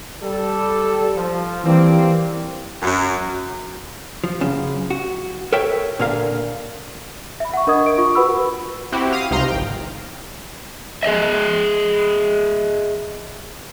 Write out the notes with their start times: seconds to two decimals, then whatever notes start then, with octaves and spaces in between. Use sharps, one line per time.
0.23 G3 A4
1.17 F3
1.64 E3 G3 A#3 C4
2.82 F#2
4.24 F3
4.40 F#2 C#3
4.90 F#4
5.53 A4 A#4 C#5 E5 G5
5.99 A#2 D3 A#4 F5
7.40 E5 B5
7.54 F#5 C#6
7.67 D4 A#4 D#5 D#6 G#6
7.86 D7
7.98 F4 C#6
8.15 F#4 A#4 B4 F#5 B5 E6
8.92 C4 E4 F#4 G4
9.13 F5 D#6
9.31 C#2 C3 D#4 F5 A#5 C6
9.48 G#1 G5
11.03 G#4 C5 D#5 E5